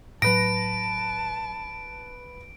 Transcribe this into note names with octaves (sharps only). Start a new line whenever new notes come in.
A2 F#3 B4 A5 A#6 D7